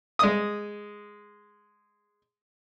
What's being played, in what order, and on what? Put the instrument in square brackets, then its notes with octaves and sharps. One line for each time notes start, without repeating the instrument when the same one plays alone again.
[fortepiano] G#3 D#6